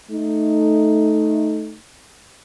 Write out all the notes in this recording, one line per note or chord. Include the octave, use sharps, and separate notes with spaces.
A3 D#4